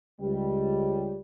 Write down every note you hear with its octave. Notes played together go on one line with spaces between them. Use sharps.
C#2 G3